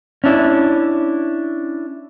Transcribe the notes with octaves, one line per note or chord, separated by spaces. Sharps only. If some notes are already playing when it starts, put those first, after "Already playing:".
C#4 D4 E4